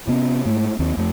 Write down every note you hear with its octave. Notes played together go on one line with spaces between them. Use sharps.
C3 B3 C#4
G#2 A3
D#2 C4
F2 A3